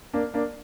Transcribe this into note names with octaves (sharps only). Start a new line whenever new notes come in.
A#3 D4
A#3 D4